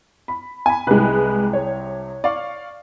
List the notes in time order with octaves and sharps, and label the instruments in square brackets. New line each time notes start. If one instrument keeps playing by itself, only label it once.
[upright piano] B5
G#5 B5
[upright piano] C2 C3 [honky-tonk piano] G#3 B4
[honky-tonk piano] C#5
[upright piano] D5 F5 C#6